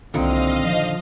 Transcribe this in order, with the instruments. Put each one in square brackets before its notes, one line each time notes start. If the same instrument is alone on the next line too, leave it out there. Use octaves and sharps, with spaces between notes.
[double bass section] C2 [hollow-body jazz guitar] A#2 D3 D#3 [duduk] C4 [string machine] D#5 F5
[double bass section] F3